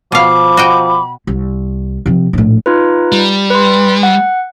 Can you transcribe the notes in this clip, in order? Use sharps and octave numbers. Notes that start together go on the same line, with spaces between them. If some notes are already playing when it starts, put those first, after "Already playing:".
B2 F3 F5 B5 D6
F#4 D#5 G5
C2
C3 F3
A#1 A2
D#4 F4 B4
G3
B4 C6
F#5